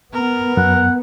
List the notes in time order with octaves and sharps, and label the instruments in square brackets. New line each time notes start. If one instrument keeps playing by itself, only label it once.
[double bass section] B3 [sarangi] A#4
[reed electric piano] F#2 [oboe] F#5